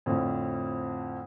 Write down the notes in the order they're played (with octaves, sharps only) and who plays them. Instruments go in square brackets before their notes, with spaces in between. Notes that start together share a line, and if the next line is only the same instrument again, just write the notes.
[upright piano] F2 A2 D3 F3 C4